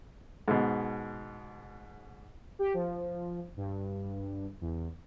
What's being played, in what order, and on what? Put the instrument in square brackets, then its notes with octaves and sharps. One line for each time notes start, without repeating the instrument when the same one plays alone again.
[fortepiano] G#2 B2
[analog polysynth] G4
F3
G2
E2